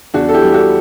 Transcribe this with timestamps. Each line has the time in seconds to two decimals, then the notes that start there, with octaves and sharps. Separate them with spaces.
0.14 E2 D4 F#4
0.29 A4
0.33 E4 G4
0.44 G3
0.54 F#4 A4